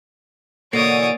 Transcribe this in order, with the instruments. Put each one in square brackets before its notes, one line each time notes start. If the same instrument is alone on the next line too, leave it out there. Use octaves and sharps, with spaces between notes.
[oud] B2 D3 E3 [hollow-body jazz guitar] A#3 [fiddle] C#5 D#6 [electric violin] A6 D7